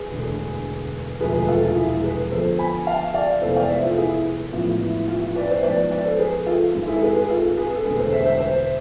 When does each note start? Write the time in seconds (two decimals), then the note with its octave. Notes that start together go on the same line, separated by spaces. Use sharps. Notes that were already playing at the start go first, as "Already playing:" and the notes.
Already playing: G#4 B4
0.10 E1 D2 D3
1.20 E1 D2 C3 F3 G#3 G#4 B4
1.34 G#4 B4
1.48 F4 A4
1.62 F4
1.75 E4 G#4
2.03 G#4 B4
2.31 F2 D3 F3 B3 A4 C5
2.59 G#5 B5
2.87 F5 A5
3.14 D5 F5
3.42 F1 F2 E3 G#3 B3 A4 C5
3.56 D5 F5
3.69 C5 E5
3.83 F4 A4
3.98 E4 G#4
4.53 A1 A2 F3 G#3 B3 F4
4.81 E4
5.08 F4
5.22 F4
5.35 B4 D5
5.50 C5 E5
5.63 G#2 F3 B3 B4 D5
5.91 B4 D5
6.05 A4 C5
6.19 G#4 B4
6.46 F4 A4
6.74 G#1 G#2 G#3 C4
6.88 E4 G#4
6.96 A4
7.02 G#4 B4
7.16 G#4 B4
7.29 F4 A4
7.58 G#4 B4
7.75 A4
7.85 E1 D2 D3 G#3 B3 G#4 B4
7.99 A4 C5
8.13 C5 E5
8.26 C5 E5
8.40 C5 E5